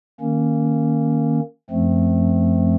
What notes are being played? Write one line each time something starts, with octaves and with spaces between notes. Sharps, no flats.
D#3 A#3 C#4
F#2 F3 A3 C4